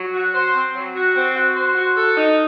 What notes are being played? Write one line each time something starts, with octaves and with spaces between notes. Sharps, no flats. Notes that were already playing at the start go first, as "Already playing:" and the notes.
Already playing: F#3
F#4
C5
C4
F#3
F#4
C4
F#4
C5
F#4
A4
D#4